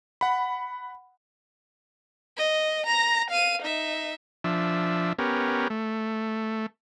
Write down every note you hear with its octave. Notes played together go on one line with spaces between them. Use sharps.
F#5 B5
D#5
A#5 A#6
F5 D#7
D#4 E5
F3 D4 E5
B3 C#4 G4 A#4
A3